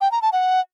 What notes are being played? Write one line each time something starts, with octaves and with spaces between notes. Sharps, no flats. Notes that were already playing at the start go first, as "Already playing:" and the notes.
G5
A#5
A5
F#5